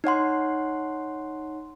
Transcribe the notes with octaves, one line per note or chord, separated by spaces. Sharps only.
D#4 C#5 F#5 C6